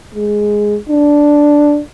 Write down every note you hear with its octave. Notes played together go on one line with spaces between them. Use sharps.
G#3
D4